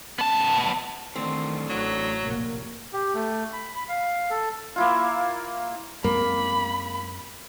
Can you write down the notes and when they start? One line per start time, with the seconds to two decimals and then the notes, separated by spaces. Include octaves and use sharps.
0.18 B3 A5
1.16 D#3 E3 A3 C4 D4
1.69 A1 A2 F#3
2.24 F1 A#1 A#3
2.93 G4
3.14 A3
3.53 B5
3.76 B5
3.89 F5
4.30 A4
4.76 A#3 E4 F4
6.04 F#2 G#3 A#3 C4 B5